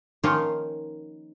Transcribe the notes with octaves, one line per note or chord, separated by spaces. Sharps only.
D#3 F3 A#3 C#4 D#4 F4